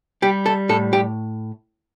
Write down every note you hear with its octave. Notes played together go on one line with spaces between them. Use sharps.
G3 G4
A4
A2 A4
G4